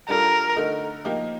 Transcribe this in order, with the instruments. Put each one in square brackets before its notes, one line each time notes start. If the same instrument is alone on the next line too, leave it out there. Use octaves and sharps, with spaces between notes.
[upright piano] G3 D4 F4 A4 [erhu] A#4
[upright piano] D3 A3 D#4 A#4
F3 A#3 D#4 G4